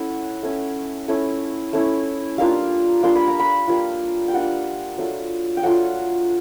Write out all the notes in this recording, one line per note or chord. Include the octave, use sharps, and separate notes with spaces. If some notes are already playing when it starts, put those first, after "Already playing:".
Already playing: A3 C#4 E4 F#5
A3 C#4 E4
A3 C#4 E4
A3 C#4 E4
G3 A#3 D4 F4 F5
G3 A#3 D4 F4 C6
B5
A#5
B5
G3 A#3 D4 F4
G5
G3 A#3 D4 F4 F#5
F#3 A3 D4 F4
G5
F#3 A3 D4 F4 F#5